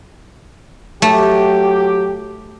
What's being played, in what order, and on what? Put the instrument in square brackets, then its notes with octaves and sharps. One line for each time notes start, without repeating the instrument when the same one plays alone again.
[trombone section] F#3 G4 [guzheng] A3